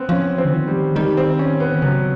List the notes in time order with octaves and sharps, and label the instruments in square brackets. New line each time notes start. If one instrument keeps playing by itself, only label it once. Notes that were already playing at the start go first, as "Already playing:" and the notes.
Already playing: [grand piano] B3 C4
[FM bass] F3 [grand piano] C#4
[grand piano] C4
[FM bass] D3
D#3
[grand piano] G3
[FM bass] D#3 [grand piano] G3
[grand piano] C4
C#4
B3
[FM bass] C#3 [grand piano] F#3